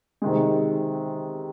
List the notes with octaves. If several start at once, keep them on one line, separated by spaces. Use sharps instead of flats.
C3 D#3 G#3